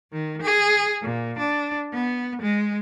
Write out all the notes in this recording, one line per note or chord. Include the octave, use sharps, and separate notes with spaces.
D#3
G#4
A#2
D4
B3
G#3